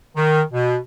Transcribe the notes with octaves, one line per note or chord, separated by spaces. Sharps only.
D#3
B2